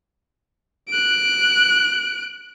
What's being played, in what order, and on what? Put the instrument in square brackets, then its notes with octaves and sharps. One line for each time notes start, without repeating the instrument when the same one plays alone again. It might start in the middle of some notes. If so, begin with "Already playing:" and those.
[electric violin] F#6 D7